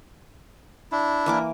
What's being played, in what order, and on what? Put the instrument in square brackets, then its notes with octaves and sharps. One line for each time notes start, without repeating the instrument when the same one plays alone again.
[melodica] D4 E4
[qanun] E3 A#3 D6